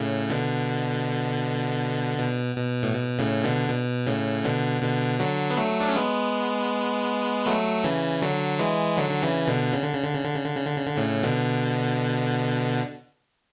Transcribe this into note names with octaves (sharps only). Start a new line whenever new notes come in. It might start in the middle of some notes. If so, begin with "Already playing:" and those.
Already playing: A2 C#3
B2 D3
B2
B2
A2
B2
A2 C#3
B2 D3
B2
A2 C#3
B2 D3
B2 D3
D3 F#3
B3
F#3 A3
D4
C#4
G#3 B3
F#3 A3
C#3 E3
D3 F#3
E3 G#3
D3 F#3
D3
C#3 E3
B2 D3
C#3
D3
C#3
D3
C#3
D3
C#3
D3
C#3
D3
C#3
D3
A2 C#3
B2 D3